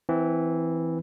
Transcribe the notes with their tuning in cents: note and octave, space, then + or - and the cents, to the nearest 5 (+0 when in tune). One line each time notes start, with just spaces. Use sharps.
E3 -5 C4 -20